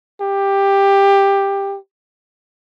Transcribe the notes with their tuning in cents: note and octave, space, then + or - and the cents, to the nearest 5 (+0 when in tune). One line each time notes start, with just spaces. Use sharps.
G4 +10